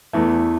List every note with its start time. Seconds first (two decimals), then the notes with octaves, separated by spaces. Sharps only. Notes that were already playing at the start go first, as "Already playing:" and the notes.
0.13 E2 E3 A3